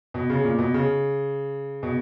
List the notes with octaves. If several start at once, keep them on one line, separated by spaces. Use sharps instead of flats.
B2
C#3
A#2
B2
C#3
B2